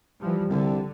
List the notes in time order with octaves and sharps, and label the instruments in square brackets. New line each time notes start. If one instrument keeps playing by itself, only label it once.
[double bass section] E3 F3 [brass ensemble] G3
[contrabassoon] C2 [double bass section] D3